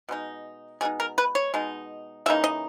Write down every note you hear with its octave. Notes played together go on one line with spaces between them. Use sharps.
B2 G#3 D#4
B2 G#3 D#4 G#4
A#4
B4
C#5
B2 G#3 D#4
C#3 E3 A#3 D#4 E5
D#5